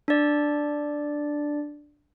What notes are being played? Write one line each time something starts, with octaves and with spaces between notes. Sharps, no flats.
D4 D5